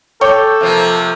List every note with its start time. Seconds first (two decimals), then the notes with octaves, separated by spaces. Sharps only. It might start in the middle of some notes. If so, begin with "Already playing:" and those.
0.21 A4 C#5 G5 C#6 D6 G6
0.61 C3 F3 A#3